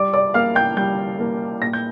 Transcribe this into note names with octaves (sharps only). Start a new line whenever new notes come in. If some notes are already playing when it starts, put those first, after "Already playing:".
Already playing: G3 D5 D6
D5 D6
A#3 F5 F6
G5 G6
G3 G5 G6
A#3
A#2 A#6
G6